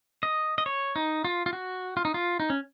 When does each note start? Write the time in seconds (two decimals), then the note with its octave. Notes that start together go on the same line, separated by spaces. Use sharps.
0.23 D#5
0.58 D#5
0.66 C#5
0.96 D#4
1.25 F4
1.46 F4
1.53 F#4
1.97 F4
2.05 D#4
2.14 F4
2.40 D#4
2.50 C#4